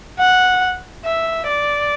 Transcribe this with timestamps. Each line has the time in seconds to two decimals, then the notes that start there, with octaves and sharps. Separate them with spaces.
0.18 F#5
1.04 E5
1.47 D5